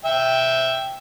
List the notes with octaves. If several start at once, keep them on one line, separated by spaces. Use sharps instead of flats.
E5 G5